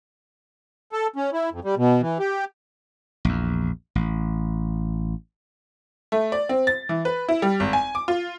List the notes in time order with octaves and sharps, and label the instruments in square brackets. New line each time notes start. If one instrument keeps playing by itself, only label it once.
[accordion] A4
C#4
E4
F2
G3
B2
E3
G4
[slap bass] A#1 E2
A1
[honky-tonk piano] A3
D5
C4
A6
E3
B4
E4
G3
G#1
G#5
D6
F4